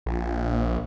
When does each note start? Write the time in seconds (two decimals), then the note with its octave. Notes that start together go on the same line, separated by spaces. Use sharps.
0.06 A#1